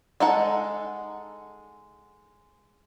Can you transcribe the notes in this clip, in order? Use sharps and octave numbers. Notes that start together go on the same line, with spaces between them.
G#3 D#4 A4 F#5